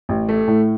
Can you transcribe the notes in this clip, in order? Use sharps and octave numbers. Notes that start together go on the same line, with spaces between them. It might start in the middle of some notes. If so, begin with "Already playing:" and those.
A1
A3
A2